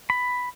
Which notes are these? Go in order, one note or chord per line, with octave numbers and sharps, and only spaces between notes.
B5